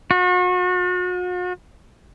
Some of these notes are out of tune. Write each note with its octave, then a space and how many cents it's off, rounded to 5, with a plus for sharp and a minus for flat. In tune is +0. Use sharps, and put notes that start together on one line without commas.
F#4 -40